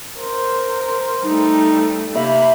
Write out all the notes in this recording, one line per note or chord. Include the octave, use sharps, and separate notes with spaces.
A#4 C5
G3 A3 D#4
C3 A#3 E5 B5